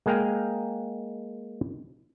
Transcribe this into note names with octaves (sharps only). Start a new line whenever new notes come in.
G#3 A#3 G#4 F5 G5